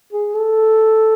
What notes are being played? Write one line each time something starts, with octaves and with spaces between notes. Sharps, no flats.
G#4
A4